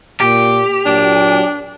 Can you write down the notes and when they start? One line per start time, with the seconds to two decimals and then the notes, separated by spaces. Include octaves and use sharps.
0.20 A#2 G4
0.86 A#2 F#3 D4